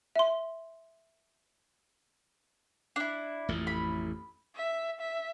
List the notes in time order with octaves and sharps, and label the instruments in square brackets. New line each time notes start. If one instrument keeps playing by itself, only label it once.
[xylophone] E5 C6
[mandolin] D4 E4
[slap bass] A1 F2 A2
[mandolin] B5
[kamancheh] E5
E5